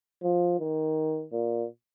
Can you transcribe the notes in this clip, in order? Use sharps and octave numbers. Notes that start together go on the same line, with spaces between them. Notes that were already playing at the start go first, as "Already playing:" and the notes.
F3
D#3
A#2